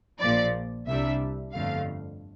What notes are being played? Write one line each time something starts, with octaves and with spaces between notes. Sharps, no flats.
A#1 A#2 F3 D5
C2 C3 G3 D4 E5
G1 F2 D3 A3 F5